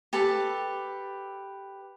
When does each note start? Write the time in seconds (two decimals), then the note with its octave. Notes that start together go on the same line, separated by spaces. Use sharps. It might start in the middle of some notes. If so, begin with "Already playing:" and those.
0.13 G4 A4 B4 A5